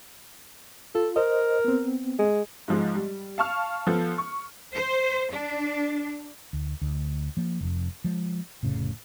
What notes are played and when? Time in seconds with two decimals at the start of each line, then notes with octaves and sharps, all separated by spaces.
0.95 F4 A4
1.16 A#4 C5 D#5
1.65 B3 C4
2.19 G#3
2.68 G#2 F3 G#3
2.95 G3
3.38 F5 A5 C#6 F6
3.87 F3 B3 A4
4.18 C#6
4.73 C5
5.31 D4
6.53 D2
6.81 D2
7.37 F3 A#3
7.61 F1 F2
8.04 F3 G#3
8.63 F1 A2 C#3